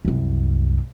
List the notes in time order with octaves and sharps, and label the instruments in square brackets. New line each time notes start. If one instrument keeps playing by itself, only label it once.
[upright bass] C2 F#2